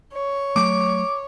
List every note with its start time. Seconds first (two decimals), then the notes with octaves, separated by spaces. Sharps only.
0.13 C#5
0.56 F#3 A3 D6